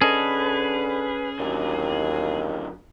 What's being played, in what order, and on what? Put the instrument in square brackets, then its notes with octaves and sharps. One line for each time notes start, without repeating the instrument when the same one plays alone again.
[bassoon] D3 [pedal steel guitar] C#4 A4 D#5 [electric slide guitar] G#4 [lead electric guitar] B4
[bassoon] D#2 [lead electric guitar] D3 F#3